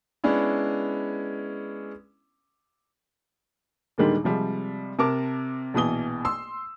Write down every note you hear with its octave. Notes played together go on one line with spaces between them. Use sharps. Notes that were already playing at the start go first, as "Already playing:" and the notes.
G#3 B3 C#4 D4 E4
D#2 A#2 D3 D#3 G3 G#3
C3 F3 G3 G#3
C3 A#4 A5 D6
A#1 B2 E3 D#6 G7
C6 E6